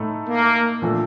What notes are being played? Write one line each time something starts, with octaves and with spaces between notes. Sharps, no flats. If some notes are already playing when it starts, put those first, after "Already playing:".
Already playing: A2 A3 D#4 A4
A#3
A#2 F3 A3 D4 A4